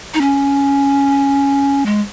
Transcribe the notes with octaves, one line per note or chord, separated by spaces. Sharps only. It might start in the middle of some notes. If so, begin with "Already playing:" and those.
D#4
C#4
G#3